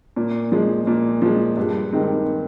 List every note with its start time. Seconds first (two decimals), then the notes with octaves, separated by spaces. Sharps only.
0.16 A#2
0.52 F3 G#3
0.87 A#2
1.22 F3 G#3
1.57 G2
1.92 D#3 G#3 C4